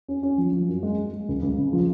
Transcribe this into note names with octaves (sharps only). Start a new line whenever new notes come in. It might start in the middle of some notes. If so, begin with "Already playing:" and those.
C#4
C#4
F3
F3
F#2
G#3
G#3
G#3
C#2
C#2
C#3
F3